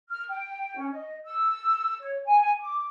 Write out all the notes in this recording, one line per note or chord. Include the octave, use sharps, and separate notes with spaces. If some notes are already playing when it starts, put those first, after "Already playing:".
F6
G5
C#4
D#5
E6
C#5
G#5
D6